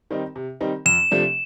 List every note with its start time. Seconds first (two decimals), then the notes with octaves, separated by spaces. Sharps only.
0.11 D#3 G3 C4 D#4
0.36 C3
0.61 D#3 G3 C4 D#4
0.86 F2 E7
1.11 C3 F3 A3 D4